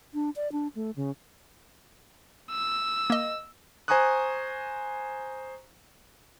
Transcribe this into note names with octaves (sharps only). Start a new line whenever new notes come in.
D4
D5
D4
A3
C#3
E6
A#3 D#5
C5 G#5 A#5 C#6 D#6 F#6